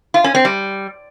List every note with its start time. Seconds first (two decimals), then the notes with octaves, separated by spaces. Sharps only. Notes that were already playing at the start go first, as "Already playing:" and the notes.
0.14 F4
0.24 C#4
0.35 C4
0.45 G3